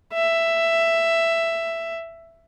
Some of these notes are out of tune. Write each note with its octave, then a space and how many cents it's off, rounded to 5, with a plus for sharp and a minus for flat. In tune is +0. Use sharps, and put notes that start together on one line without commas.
E5 +10